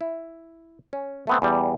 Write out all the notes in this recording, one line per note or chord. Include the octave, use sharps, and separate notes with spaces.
E4
C#4
A3 B3 C4
E2 G3